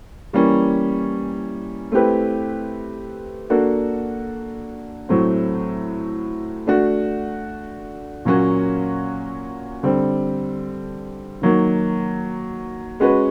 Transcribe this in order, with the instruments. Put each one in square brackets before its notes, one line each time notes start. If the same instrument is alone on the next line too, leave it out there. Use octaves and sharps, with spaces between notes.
[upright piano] E3 G3 A#3 C#4
A3 C4 E4 G4 B4
A#3 D4 F#4 A4
A2 F#3 A3 C4
A3 D4 F#4
A#2 F#3 A#3 C#4 F#4
D3 G3 C4
D#3 F#3 A#3
G#3 C#4 F#4 B4